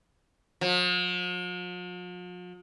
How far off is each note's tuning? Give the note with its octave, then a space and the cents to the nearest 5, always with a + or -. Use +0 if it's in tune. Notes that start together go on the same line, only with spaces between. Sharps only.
F3 +45